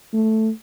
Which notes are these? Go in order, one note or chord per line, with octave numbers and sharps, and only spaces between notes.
A3